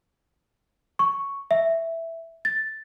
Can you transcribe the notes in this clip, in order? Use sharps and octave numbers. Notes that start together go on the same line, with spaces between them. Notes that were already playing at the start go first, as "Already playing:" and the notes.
C#6
E5
A6